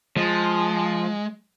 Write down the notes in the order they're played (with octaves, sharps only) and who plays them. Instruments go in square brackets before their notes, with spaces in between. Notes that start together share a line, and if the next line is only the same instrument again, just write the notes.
[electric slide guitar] F3 [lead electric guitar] G#3